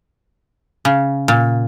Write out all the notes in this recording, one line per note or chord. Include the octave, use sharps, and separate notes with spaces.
C#3
A#2